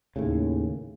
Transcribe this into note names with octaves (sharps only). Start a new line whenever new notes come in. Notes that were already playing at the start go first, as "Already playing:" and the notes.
D#2 A2 C#3